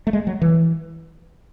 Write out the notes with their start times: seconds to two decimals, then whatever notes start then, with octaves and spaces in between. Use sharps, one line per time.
0.07 A3
0.13 G#3
0.27 F#3
0.42 E3